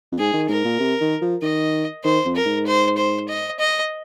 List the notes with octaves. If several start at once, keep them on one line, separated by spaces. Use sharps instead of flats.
F2
G#2 G#4
D#3
G#2 A#4
A#2
C3
D#3
F3
D#3 D#5
D#3 C5
F2
A#4
G#2
C5
C5
D#5
D#5